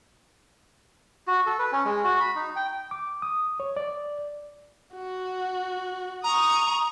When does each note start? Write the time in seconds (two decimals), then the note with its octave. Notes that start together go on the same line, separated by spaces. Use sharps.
1.27 F#4
1.46 A4
1.59 B4
1.72 C#4
1.85 G#3
2.04 F#4
2.20 B5
2.36 D#4
2.56 G5
2.91 D6
3.22 D#6
3.60 C#5
3.77 D5
4.95 F#4
6.24 A#5 C#6 D#6